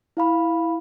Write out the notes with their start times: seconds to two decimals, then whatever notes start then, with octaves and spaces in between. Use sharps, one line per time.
0.17 E4 F5 B5